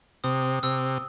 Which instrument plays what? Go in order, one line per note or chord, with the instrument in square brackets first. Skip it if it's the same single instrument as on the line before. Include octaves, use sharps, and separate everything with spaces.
[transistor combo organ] C3 [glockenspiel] D#6
[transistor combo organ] C3 [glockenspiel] E6